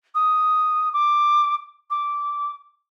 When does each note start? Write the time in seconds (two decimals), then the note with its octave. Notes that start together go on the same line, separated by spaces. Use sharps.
0.15 D#6
0.94 D6
1.91 D6